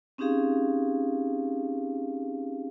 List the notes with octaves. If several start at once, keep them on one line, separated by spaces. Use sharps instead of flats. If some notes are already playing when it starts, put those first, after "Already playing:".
C4 C#4 D#4 G4 G#4 F5